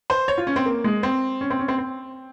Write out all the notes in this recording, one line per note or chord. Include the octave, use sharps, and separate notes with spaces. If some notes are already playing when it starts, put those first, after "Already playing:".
C5
C#5
F4
C#4
C4
A#3
G#3
C4
C#4
C4
C#4
C4
C4